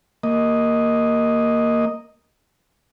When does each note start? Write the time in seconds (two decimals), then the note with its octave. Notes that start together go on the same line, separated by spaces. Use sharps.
0.23 A#3 D#5